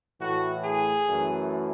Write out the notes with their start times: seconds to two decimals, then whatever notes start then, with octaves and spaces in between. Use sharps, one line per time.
0.21 A2 E3 A3 F#4
0.64 G#4
1.08 F#2 E3 A3